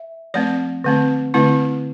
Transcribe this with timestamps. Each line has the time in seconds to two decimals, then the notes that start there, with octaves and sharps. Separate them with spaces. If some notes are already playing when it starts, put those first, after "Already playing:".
Already playing: E5
0.34 F3 A3 C4 D5
0.84 D3 A3 C4
1.34 D3 A3 C4 E4